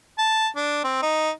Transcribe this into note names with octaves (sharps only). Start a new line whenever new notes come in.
A5
D4
C4
D#4